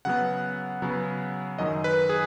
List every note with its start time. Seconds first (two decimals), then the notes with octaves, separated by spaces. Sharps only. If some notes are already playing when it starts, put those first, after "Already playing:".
0.05 C#3 F#3 B3 F#5
0.82 C#3 F#3 B3
1.58 F#2 D#3 F#3 D#5
1.84 B4
2.09 G#4